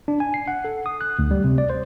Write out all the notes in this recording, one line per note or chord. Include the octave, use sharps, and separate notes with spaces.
D4
G#5
C7
F#5
A4
D#6
F#6
D2
G3
C3
D5
C5